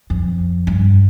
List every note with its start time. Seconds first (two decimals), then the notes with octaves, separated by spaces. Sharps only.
0.10 F2
0.67 G2